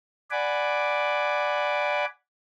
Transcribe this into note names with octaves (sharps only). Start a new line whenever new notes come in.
D5 F#5 G#5 B5 D6